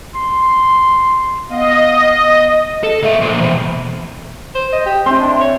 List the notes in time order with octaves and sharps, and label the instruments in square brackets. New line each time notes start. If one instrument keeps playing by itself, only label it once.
[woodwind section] C6
[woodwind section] B3 F5 [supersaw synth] D#5
[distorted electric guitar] A4
A#3 E5
A#2 C5
E2 B2
[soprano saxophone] C5
D#5
G4
[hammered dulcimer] C4 E4 [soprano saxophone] C6
[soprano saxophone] D4
C#5